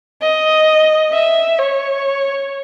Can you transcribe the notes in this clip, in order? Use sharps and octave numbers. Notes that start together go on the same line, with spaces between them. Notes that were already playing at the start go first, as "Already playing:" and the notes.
D#5
E5
C#5